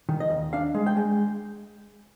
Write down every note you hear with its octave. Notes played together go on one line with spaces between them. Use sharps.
D#3
D#5
D#2
D4 F5
G#3
G5
G#3